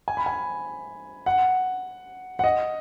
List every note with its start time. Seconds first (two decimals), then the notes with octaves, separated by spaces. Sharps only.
0.08 G#5
0.17 B5
0.26 G#5
1.26 F#5
2.39 F#5
2.44 D#5